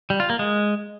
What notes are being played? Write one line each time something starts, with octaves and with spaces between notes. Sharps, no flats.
G3
F4
A#3
G#3